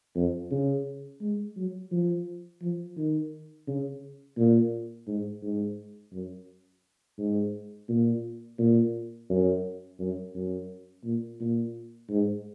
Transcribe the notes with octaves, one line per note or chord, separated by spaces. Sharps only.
F2
C#3
G#3
F#3
F3
F3
D#3
C#3
A#2
G#2
G#2
F#2
G#2
A#2
A#2
F#2
F#2
F#2
A#2
A#2
G#2